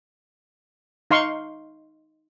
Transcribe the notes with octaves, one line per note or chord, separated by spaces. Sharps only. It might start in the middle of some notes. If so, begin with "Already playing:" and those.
D#4 F5 C6 C#6